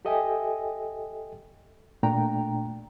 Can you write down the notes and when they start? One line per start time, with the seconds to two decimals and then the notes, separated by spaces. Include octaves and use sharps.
0.05 G4 A4 D#5 E5 G5 G#5
2.03 A#2 A3 D4 G5 A#5